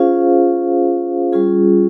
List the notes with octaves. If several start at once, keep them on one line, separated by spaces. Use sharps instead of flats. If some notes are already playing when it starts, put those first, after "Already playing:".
Already playing: C#4 F4 G#4 C5 F5
G3 C#4 F4 G#4